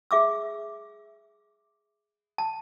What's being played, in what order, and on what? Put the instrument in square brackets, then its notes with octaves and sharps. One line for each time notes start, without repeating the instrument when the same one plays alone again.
[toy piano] G#4 E5 D6 E6
A5